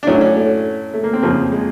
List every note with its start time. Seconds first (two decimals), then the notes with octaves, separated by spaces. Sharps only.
0.03 D4
0.07 A2 F#3 C#4
0.21 C#4
0.36 A3
0.94 A3
1.04 A#3
1.13 C4
1.23 F2 C#3 F3 A#3
1.52 G#3